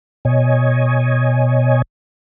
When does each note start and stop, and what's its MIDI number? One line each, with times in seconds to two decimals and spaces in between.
0.25 1.82 47
0.25 1.82 73
0.25 1.82 75
0.25 1.82 80